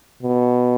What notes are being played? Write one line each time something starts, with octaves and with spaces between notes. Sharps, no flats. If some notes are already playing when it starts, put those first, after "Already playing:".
B2